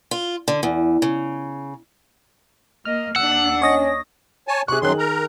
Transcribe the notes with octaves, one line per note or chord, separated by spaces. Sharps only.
F4
D3
E2
C#3
A#3 D#5 F6
D#2 D4 F#5 E6
C#4 C#5 D#5 A#6
C#5 G#5 A5
C3 G#4 C#6 F#6
F#2 D#3 F#3 G#4 C6 F#6
A#4 A#5